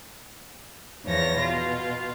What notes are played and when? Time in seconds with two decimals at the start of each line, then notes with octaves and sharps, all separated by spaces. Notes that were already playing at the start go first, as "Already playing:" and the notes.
1.05 E2 F3 C#5 A#6
1.38 B2 F4